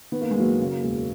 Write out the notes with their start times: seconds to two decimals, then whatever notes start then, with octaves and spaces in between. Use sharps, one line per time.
0.12 D#3 B3
0.21 A#3
0.31 G#3
0.35 F#1 F#3 A#3
0.60 C#3
0.84 E1